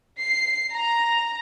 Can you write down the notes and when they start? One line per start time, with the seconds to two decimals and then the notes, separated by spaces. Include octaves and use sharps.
0.19 C7
0.71 A#5